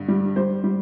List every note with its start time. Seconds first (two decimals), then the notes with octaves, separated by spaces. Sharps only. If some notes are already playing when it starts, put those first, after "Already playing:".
Already playing: G2 D3
0.08 G3
0.36 G3 C5
0.64 G3